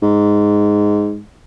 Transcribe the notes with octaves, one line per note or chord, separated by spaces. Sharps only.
G#2